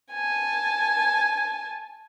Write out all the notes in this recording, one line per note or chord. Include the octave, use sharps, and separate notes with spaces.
G#5 A5